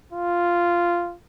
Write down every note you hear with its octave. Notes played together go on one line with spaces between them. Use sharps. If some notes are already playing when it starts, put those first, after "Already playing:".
F4